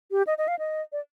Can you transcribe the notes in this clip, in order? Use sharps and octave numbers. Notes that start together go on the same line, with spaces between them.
G4
D#5
D#5
F5
D#5
D5